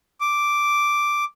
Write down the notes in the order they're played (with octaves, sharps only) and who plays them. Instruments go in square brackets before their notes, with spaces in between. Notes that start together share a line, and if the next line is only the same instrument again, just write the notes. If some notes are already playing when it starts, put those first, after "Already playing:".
[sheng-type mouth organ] D6